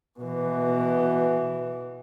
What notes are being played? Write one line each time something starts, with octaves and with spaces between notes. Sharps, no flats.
B2 E3